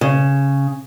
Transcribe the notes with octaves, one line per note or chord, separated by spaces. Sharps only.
C#3